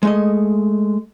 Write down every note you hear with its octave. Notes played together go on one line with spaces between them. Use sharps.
G#3 A3 D#5